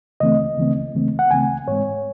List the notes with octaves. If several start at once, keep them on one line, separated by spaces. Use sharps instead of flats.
C#2 C#3 E3 A3 C4 D#5
C#2 C#3 E3 A3 C4
C#2 C#3 E3 A3 C4
F#5
C#2 C#3 E3 A3 C4 G#5
G#2 E3 G#3 C4 C#5